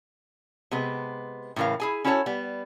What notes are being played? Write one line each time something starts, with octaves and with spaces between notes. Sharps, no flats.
C3 G#3 B3
A2 C#3 E3 A#4 F5
E4 G#4 G#5
C#4 E4 F#4 A4 C#5 A5
G3 B3